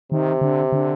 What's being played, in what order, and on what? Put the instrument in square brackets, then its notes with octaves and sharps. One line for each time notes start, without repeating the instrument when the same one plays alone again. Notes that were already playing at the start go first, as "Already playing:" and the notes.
[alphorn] C3 [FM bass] D#3
[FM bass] D3
D3